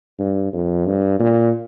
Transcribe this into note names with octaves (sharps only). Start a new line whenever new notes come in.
G2
F2
G2
A#2